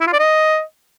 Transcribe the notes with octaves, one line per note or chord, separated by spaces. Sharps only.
E4
F4
D5
D#5